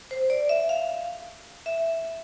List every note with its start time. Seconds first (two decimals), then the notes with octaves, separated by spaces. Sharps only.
0.11 C5
0.30 D5
0.49 E5
0.69 F5
1.66 E5